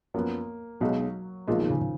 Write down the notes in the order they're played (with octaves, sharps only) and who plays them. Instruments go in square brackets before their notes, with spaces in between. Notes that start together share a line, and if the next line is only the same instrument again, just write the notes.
[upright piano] F#2 F3 B3 [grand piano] A#3
[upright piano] B1 B2 G#3 D#4 F#4 [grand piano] F#3
[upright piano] B1 A#2 G#3 [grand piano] F3
[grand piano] D#3
C#3
C#3